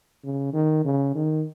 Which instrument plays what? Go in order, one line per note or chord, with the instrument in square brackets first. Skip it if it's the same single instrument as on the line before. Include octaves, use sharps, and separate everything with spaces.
[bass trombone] C#3
D#3
C#3
D#3